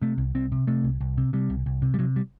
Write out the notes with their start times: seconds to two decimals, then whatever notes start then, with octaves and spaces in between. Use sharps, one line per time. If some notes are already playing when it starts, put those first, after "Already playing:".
0.02 C3 A3
0.18 C2
0.35 C2 C4
0.52 C3
0.67 C3 A3
0.84 C2
1.01 C2
1.17 C3
1.33 C3 G3
1.50 C2
1.66 C2
1.82 C3
1.94 G3
1.99 C3 F#3
2.16 G3